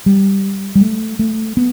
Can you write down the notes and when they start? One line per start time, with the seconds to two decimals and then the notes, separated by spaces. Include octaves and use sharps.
0.06 G3
0.75 G3
0.81 A3
1.19 A3
1.57 B3